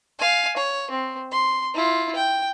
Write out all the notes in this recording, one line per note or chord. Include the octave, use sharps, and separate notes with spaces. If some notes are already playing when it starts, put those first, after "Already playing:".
F5 G#5
C#5
C4
C6
E4 F4
G5